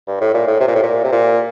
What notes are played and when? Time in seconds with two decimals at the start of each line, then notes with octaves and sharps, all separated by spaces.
0.07 G2
0.21 A2
0.34 A#2
0.47 A2
0.60 C3
0.68 A#2
0.75 A2
0.83 A#2
1.04 C3
1.12 A#2